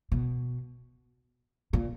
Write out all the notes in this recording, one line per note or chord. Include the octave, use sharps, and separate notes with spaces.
B2
A#2